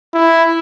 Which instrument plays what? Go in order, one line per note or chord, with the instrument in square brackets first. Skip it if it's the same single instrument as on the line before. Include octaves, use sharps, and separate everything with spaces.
[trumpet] E4